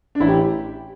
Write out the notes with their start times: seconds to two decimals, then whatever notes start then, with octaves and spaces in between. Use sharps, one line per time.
0.15 D4
0.20 A1 E4
0.28 G4